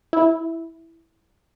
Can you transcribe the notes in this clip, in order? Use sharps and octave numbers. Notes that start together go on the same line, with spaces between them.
E4